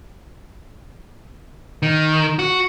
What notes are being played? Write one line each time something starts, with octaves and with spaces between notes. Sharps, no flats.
D#3
F#4